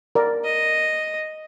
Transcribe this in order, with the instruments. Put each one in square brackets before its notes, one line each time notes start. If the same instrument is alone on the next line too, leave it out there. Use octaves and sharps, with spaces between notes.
[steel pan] A#4 D5
[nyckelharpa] D#5